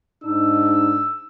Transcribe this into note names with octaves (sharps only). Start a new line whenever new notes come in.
G#2 D4 D#4 E6